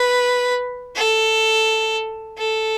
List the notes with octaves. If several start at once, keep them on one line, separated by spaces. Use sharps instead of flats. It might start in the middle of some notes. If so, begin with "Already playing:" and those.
Already playing: B4
A4
A4